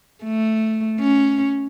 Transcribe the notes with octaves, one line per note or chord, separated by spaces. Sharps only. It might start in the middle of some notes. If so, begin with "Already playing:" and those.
A3
C#4